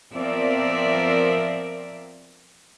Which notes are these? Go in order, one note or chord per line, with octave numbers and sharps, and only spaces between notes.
F3 B3 C4 A#4 D5 E5